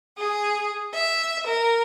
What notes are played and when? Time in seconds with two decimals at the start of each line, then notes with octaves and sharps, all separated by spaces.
0.17 G#4
0.95 E5
1.47 A#4